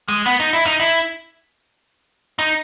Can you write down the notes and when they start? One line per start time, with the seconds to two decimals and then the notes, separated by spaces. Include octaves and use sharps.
0.08 G#3
0.26 B3
0.40 D#4
0.53 E4
0.66 D#4
0.80 E4
2.39 D#4